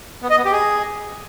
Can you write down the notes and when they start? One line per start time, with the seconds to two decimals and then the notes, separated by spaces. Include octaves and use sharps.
0.23 B3
0.30 D#5
0.38 B3
0.45 G4
0.53 G#4